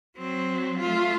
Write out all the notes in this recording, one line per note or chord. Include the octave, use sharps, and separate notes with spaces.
F#3 C4
A3 F4